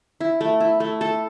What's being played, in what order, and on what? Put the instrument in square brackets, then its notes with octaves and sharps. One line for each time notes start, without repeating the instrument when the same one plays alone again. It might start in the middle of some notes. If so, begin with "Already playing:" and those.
[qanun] E4
A3
E4
A3
A4